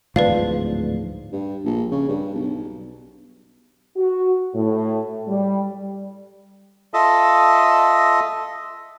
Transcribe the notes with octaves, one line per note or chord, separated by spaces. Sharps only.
D1 G#2 F3 B4 D5 F5
G2
A#1
C#3
G2
B1
F#4
A2
G3
F4 A4 D#5 E5